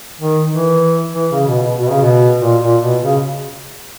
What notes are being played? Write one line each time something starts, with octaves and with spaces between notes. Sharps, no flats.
D#3
E3
E3
C#3
B2
B2
B2
C#3
B2
A#2
A#2
B2
C#3